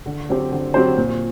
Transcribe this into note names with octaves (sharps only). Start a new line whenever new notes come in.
D3
F#3 C4 G4 C5
D3
F#3 C4 G4 C5
A#2